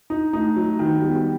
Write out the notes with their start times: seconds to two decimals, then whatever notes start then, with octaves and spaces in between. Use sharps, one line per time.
0.10 D#4
0.33 A3 D#4
0.56 F#3
0.79 D#3 B3
1.02 G3